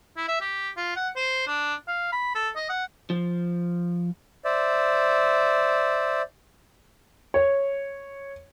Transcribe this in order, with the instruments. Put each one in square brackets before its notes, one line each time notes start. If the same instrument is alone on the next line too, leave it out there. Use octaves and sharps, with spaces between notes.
[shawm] E4
E5
G4
F4
F#5
C5
D4
F5
B5
A4
D#5
F#5
[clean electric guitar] F3
[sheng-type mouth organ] C5 D5 E5
[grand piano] C#5